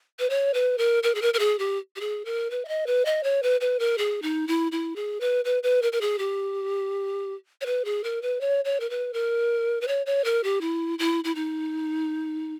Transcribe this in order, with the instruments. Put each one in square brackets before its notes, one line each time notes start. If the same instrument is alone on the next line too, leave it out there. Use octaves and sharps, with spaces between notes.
[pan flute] B4
C#5
B4
A#4
A#4
G#4
A#4
A#4
G#4
G4
G4
G#4
A#4
B4
E5
D#5
B4
D#5
C#5
B4
B4
A#4
G#4
D#4
E4
E4
G#4
B4
B4
B4
A#4
A#4
G#4
G4
C#5
B4
G#4
A#4
B4
C#5
C#5
A#4
B4
A#4
B4
C#5
C#5
A#4
G4
E4
E4
E4
D#4